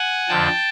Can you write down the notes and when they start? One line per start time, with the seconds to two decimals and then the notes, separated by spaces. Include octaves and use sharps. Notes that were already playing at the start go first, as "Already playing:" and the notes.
Already playing: F#5 G#5
0.28 F2 D3 F3 G5 A5